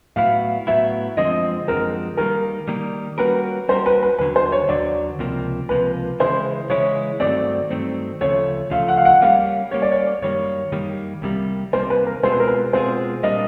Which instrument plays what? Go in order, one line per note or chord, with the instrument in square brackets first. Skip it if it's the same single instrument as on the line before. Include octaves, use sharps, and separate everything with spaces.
[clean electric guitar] A2 F#3 B3 E4 [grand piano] F5
[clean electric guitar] A2 F#3 B3 E4 [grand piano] E5
[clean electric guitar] F#2 D3 F3 G#3 C4 [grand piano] D#5
[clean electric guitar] F#2 D3 F3 G#3 C4 [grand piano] A#4
[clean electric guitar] D#3 G3 A#3 [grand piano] A#4
[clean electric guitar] D#3 G3 A#3
[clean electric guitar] G3 A#3 C#4 F#4 A#4 [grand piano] B4
[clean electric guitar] G3 A#3 C#4 F#4 A#4 [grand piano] C5
[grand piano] B4
B4
[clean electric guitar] D#2 D3 F#3 [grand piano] B4
[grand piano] C5
C#5
[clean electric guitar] D#2 D3 F#3 [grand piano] D5
[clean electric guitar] C#2 C3 F3 A#3
[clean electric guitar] C#2 C3 F3 A#3 [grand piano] B4
[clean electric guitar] C#3 E3 G#3 C#4 E4 [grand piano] C5
[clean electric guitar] C#3 E3 G#3 C#4 E4 [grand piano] C#5
[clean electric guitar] G2 D#3 F#3 A3 C4 [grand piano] D5
[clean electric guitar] G2 D#3 F#3 A3 C4
[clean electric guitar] D2 C#3 F3 A3 [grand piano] C#5
[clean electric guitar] D2 C#3 F3 A3 [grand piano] F5
[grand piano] F#5
F5
F#5
[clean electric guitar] G3 A#3 C#4 [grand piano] F5
[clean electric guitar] G3 A#3 C#4 [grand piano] C#5
[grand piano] D5
C#5
[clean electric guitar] F#2 D#3 G3 A#3 [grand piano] C#5
[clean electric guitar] F#2 D#3 G3 A#3
C2 C3 D#3 G3 A#3
[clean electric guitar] C2 C3 D#3 G3 A#3 [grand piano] C5
[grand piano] B4
A#4
[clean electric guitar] B2 G#3 C4 F4 G#4 [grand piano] C5
[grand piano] B4
A#4
B4
[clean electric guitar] B2 G#3 C4 F4 G#4 [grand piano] C5
[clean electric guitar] A#2 G3 A#3 D4 [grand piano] D#5